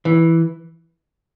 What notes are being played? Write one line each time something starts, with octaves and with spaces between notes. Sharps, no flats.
E3